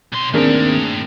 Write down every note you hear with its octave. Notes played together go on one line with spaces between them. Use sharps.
B1 C6
D#2 A3 C4 D4 G#4 A#4 G5